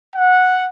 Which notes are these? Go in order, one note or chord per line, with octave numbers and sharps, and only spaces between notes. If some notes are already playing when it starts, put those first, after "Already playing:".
F#5